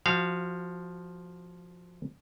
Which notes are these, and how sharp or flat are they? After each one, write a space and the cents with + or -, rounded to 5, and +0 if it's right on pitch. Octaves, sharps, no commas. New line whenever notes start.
F3 +0 F#4 +0 F5 -20